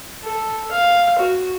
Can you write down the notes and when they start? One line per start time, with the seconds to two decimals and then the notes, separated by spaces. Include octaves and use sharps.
0.24 A4
0.72 F5
1.18 F#4